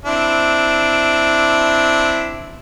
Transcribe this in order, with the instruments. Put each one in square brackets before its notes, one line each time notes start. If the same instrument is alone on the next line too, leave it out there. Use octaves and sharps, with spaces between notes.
[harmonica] C4 D4 E4